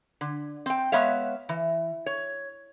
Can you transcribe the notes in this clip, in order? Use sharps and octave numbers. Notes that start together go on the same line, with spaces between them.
D3
C4 G5
G#3 B3 C#5 E5 F5
E3
C#5